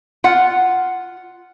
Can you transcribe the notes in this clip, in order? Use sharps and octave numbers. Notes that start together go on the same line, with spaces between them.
F4 F#5